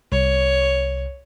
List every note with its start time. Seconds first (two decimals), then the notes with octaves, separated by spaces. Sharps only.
0.12 C2 C#5